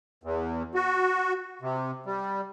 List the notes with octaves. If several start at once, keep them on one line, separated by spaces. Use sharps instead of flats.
E2
F#4
C3
G3